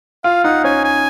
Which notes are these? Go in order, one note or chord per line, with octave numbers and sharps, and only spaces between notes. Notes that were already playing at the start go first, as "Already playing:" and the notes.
F4 F5
D#4 F#5
C#4 G#5
G#5